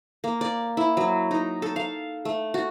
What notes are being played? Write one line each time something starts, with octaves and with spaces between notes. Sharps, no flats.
A#3
D5
E4
F#3
D#4
A4
F5
A3
F#4